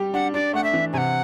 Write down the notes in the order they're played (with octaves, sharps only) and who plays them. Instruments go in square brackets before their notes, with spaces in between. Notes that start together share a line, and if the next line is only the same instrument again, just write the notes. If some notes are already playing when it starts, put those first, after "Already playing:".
Already playing: [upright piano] G3 G4
[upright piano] D4 [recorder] F#5
[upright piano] D4 [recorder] D5
[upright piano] A3 [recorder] F#5
[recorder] E5
[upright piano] E3
[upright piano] C3 [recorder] F#5 G#5